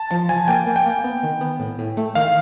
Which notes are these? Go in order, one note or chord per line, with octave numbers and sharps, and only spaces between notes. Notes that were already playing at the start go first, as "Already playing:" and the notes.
Already playing: A5
F3 A5
F3 G#5
A#3 G5
A#3
G5
A#3
B3
D#3
B3
A2
A2
A3
D#3 F5